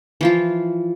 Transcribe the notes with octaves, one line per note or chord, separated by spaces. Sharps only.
E3 F3 F4